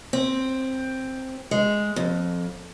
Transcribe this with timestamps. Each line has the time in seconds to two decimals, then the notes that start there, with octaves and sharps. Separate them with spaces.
0.13 C4
1.51 G#3
1.96 F2